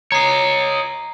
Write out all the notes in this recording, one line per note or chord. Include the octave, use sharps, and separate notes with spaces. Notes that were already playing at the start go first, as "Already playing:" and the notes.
C#5 D#5 A#5 C7